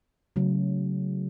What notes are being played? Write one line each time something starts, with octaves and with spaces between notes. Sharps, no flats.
C#3 F#3 A3